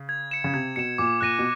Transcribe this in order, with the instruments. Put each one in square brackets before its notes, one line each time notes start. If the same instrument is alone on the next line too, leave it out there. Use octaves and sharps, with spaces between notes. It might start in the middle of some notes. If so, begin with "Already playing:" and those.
Already playing: [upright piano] C#3
[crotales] G#6
C#7 E7
[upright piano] C#3
[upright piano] C3 [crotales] G#6
[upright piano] B2 [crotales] C#7 E7
[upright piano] A#2 [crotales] D6
[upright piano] A#2 [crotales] F#6 A#6 D#7
[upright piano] B2